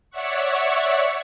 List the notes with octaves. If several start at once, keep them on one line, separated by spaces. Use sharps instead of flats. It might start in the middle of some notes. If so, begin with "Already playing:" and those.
C#5 D5 E5 F#5 C#6